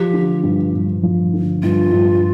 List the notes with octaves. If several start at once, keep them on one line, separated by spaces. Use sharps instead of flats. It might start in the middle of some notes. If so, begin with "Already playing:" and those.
Already playing: F3 G4
D3
G2
G2
F3
D3
G2 F4
G2